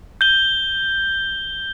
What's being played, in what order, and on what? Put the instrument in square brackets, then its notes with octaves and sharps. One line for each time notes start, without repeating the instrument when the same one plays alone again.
[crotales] G6 G7